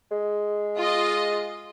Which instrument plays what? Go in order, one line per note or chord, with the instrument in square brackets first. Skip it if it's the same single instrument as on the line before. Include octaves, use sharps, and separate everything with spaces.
[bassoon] G#3
[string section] F4 D#5